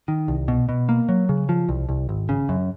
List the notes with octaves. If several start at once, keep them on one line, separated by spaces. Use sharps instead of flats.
D#3
C2
B2
B2
A#3
F#3
C#3
F3
C2
C2
G#1
C#3
F#2